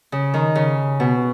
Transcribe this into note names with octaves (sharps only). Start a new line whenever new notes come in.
C#3
D#3
C#3
B2